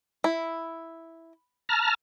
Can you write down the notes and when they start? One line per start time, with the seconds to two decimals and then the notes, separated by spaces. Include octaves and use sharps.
0.24 E4
1.69 A5 A#5 F6